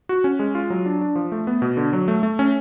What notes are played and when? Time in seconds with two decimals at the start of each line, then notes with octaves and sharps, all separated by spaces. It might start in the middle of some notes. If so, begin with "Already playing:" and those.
0.09 F#4
0.24 C#4
0.39 G#3
0.55 F4
0.70 F#3
0.86 D4
1.01 D4
1.16 F3
1.32 A3
1.47 B3
1.62 B2
1.77 D3
1.93 F#3
2.08 A3
2.23 A3
2.39 C#4